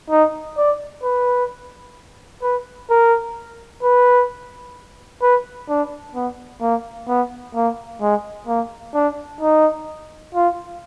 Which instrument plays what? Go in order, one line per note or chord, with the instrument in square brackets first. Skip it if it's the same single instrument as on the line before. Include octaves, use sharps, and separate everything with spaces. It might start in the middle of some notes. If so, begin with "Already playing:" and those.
[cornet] D#4
D5
B4
B4
A#4
B4
B4
D4
B3
A#3
B3
A#3
G#3
A#3
D4
D#4
F4